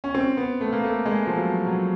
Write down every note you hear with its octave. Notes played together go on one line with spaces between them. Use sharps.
C#4
C4
B3
A3
A#3
A3
G#3
F3
F#3
F#3